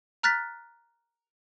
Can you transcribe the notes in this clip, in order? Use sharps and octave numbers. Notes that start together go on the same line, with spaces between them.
A#5 F6 F#6 A6 B6